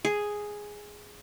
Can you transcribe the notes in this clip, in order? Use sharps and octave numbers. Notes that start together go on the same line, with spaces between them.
G#4